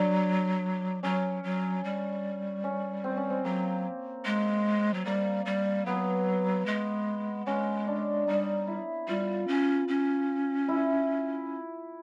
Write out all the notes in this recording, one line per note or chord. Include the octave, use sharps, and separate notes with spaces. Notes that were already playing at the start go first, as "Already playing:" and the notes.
Already playing: F#3 D4
F#3 C#4
F#3
G3
C#4
C4
C#4
C4
F#3 A#3
G#3
F#3
G3 A#3
G3
F#3 B3
G#3
G#3 C#4
D4
G3 D#4
E4
G3 F4
C#4
C#4
E4